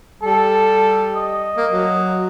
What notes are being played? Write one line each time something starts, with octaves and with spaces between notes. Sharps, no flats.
G3 A4
D#5
A#3
F#3